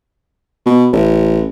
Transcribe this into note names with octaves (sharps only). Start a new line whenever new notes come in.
B2
A1